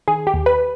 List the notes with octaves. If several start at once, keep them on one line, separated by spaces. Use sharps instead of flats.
D#3 G#4
G4
D#2
B4